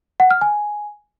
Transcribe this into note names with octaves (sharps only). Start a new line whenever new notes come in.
F#5
F6
G#5